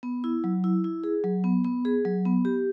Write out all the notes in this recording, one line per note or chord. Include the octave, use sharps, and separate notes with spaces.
B3
E4
F#3
E4
E4
G#4
F#3
B3
B3
G#4
F#3
B3
G4